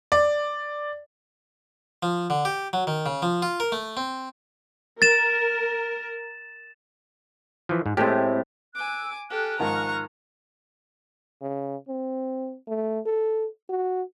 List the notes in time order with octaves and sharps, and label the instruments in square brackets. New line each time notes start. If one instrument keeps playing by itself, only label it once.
[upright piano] D5
[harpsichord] F3
D3
G4
F#3
D#3
C#3
F3
F4
A#4
A3
C4
[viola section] A#4 [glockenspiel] A6 E7
[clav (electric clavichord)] E3 F3
G#2
[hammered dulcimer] A2 C4 [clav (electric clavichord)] G#3 A3 G4
[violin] G#5 D6 [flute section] E6 F#6
[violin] G4 A4 [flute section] G#5 F6 F#6
[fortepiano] G#2 D#3 F3 [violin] A#5 C#6
[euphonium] C#3
C4
A3
A4
F#4